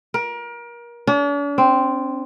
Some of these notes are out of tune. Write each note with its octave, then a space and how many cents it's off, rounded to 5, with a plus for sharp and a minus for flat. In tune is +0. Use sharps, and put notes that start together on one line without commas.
A#4 +30
D4 -45
C4 -5